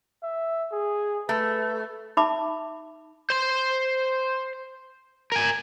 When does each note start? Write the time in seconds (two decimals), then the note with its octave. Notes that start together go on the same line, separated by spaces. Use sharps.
0.23 E5
0.72 G#4
1.29 A3 B4
2.17 D#4 E5 A5 B5 D6
3.30 C5 C6
5.32 A#4 G#5